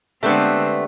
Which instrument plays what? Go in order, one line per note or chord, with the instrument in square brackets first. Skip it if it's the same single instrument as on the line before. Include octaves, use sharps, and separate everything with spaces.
[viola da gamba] D3 G#3 C4 [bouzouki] A3 B3 [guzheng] D4 G4 A4